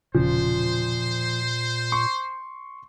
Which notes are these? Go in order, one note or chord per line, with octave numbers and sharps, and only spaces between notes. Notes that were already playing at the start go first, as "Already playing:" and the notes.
E1 A#2 C#3 F3 C5
C6 C#6